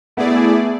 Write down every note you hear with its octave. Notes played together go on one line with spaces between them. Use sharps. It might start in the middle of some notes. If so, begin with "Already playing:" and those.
A3 B3 E4 G#4 D5